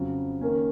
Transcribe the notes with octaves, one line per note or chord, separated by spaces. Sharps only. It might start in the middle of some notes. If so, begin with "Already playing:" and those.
Already playing: F2 C#3 F#3
D#3 A#3 C#4